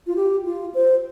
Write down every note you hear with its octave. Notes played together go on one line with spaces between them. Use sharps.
F4
G4
F4
C5